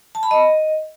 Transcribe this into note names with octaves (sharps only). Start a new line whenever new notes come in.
A5
B5
D#5